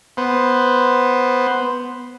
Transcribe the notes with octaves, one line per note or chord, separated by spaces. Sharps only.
B3 C5